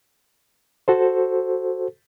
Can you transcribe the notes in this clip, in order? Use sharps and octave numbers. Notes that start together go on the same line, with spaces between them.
F#4 A4 C5